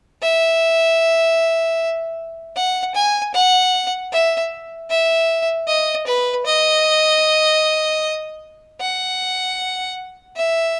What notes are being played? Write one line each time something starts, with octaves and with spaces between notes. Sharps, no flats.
E5
F#5
G#5
F#5
E5
E5
D#5
B4
D#5
F#5
E5